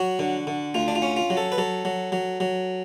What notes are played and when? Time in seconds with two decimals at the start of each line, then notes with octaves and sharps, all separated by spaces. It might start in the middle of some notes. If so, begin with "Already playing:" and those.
Already playing: F#3 F#4
0.19 D3
0.47 D3
0.74 D2 F4
0.88 D4
0.95 F4
1.02 C#4
1.17 F4
1.30 F#3
1.37 A4
1.52 B4
1.58 F#3 A4
1.85 F#3
2.12 F#3
2.40 F#3